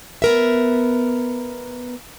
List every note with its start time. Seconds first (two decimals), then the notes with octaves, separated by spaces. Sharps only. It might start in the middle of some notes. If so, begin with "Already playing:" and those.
0.22 B3 A#4 E5